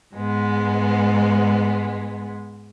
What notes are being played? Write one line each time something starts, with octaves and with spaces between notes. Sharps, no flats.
G#2 G#3 B3